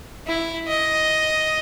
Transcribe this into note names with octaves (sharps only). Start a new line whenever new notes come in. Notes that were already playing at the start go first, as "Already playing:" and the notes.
E4
D#5